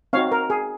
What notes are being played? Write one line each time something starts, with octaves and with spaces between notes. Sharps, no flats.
C4 D#4 F#4 C#5 F5
A#4
G#4